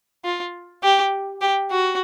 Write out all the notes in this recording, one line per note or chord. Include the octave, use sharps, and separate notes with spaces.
F4
G4
G4
F#4